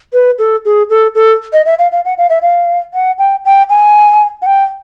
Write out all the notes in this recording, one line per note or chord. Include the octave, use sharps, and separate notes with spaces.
B4
A4
G#4
A4
A4
D#5
E5
F5
F5
F#5
F5
E5
F5
F#5
G5
G5
G#5
F#5
G5